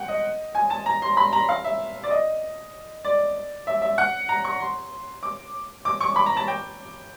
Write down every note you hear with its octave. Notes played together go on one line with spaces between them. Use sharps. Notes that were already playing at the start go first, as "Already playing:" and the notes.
Already playing: F#5 G5
D#5
G#5
A5
A#5
C6
B5
A#5
F5
E5
D5
D#5
D5
E5
E5
F#5
A#5
C#6
C6
D6
D6
C#6
B5
A#5
A5
G5